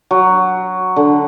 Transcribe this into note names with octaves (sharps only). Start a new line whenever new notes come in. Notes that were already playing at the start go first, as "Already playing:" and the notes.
F#3
D3